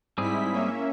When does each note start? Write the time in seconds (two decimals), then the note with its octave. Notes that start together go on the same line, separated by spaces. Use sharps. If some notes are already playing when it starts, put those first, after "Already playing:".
0.18 G#2 G3 C4 E4 G#4 B6
0.52 A#3 C#4 E5